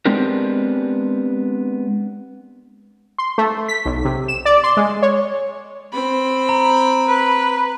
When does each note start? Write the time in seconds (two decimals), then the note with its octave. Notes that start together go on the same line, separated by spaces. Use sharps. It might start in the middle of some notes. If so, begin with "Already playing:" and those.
0.06 G#3 B3 C4 D4 G4 A#4
3.18 C6
3.38 A3
3.68 B6
3.86 B1
4.05 C3
4.28 E7
4.45 D5
4.64 C6
4.77 G#3
5.02 C#5
5.93 C4 B5
6.49 A#5
7.07 B4